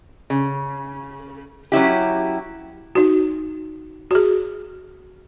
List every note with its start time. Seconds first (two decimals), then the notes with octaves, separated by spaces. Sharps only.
0.30 C#3
1.72 F#3 C#4 E4 G4
2.95 D#4 F#4
4.11 F#4 G#4